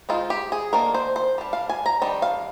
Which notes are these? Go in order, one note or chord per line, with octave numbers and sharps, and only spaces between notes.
G#3 C4 D#4 F4
G4
G#4
D#3 A#3 D4 A#4
C5
C5
G3 D4
F5
G#5
A#5
D#3 G3 D4 G5
F5